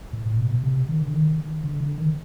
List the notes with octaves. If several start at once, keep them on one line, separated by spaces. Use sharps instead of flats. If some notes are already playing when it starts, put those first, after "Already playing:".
A2
A2
B2
B2
C3
D#3
D3
D#3
D3
D3
D#3